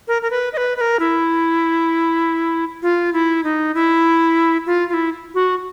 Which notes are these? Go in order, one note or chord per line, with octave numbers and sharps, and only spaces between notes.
A#4
A#4
B4
D#5
B4
B4
A#4
E4
F4
E4
D#4
E4
F4
F4
E4
F#4